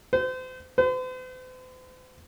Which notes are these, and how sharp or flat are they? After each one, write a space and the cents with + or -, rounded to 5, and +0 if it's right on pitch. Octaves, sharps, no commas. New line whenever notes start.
C5 -35
C5 -45